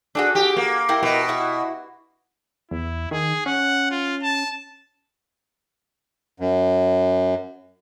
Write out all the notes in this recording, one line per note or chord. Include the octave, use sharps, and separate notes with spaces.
D4 F#4 G#4 A4
G4
A#3
E4 A#4 G5
B2
E4 F#4 E5
E2 E4
D#3 G#4
C#4 F#5
F4
A5
F#2